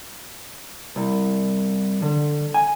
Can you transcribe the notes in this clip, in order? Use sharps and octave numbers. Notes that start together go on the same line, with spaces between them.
C2
D3
G#5